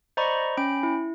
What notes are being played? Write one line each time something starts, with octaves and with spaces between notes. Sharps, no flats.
C5 D5 D#5 A#5 B5 C#6
C#4 G5 B5 D7
E4